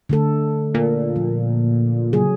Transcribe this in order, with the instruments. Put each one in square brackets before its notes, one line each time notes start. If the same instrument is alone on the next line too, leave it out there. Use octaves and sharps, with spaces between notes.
[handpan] D3 A3 A4
[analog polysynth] A#2
[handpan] F3
C#3 F#3 G#4